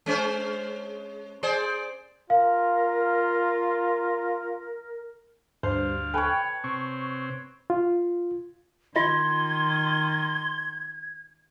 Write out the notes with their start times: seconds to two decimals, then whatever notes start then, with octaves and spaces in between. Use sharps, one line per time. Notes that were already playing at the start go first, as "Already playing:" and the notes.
0.06 G#3 C#4 C5
1.43 G#4 C5 D5
2.30 F4 A#4 F5
5.63 D2 G2 C5 F5
6.14 A4 B4 C#5 G5 G#5
6.64 C3 C4 C#6
7.70 F4
8.96 D#3 F4 D#5 C6 G#6